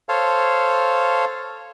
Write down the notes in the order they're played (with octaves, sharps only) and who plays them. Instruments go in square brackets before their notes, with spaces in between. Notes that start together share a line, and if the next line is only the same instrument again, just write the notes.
[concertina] A4 C5 C#5 F5